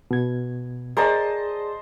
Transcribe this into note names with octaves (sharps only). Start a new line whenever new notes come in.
B2 G#6
G#4 A#4 C5 D5 D#5 A5